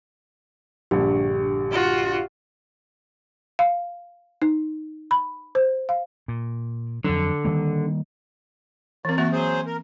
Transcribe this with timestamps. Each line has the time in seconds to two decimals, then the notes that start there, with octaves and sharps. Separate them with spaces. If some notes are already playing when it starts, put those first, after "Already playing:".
0.91 A#1 G2 D3 G4
1.71 F4 F#4
3.59 F5
4.42 D#4
5.11 B5
5.55 C5
5.89 F5
6.28 A#2
7.04 F2 D3 F#3
7.45 D#3 G3 A#3
9.05 E3 A#3 C4
9.18 E3 A#3 F#4 E5
9.32 F#3 G#4 C5
9.66 A#4